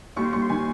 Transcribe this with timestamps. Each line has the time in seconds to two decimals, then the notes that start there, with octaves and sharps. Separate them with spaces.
0.16 D#2 C#6
0.24 C6
0.33 D#2 C#6
0.42 C6
0.49 D#3 G#5